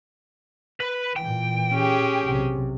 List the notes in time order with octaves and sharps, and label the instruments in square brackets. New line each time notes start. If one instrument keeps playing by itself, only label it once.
[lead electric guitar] B4
[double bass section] A#2 E3 [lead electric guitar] G5
[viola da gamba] C#4 G4 G#4
[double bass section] B1 C3